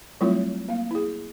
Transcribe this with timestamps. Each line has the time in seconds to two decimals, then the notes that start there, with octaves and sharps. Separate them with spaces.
0.21 F#3 G3 A3 C4 E4 F4
0.69 A#3 F5
0.91 E4 G#4